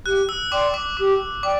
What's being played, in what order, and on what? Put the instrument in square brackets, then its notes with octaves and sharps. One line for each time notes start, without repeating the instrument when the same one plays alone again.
[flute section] G4 [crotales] F#6
[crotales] E6
[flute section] D5 G5 C6 [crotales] D6
[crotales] D6
[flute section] G4 [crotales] D6
[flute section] D5 G5 [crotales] D6